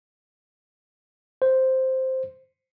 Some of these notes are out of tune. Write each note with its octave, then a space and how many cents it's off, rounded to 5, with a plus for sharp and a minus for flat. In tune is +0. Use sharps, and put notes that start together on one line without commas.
C5 +0